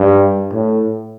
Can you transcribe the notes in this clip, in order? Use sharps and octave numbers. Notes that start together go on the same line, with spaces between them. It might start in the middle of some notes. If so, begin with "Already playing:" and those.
Already playing: G2
A2